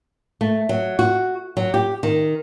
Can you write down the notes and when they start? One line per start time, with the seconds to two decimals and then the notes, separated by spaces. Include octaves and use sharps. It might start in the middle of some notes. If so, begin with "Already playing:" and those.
0.41 A3
0.69 F#3
0.99 F#4
1.57 F#3
1.74 G4
2.03 D#3